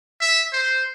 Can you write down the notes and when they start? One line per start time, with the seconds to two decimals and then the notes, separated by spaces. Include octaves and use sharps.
0.21 E5
0.53 C5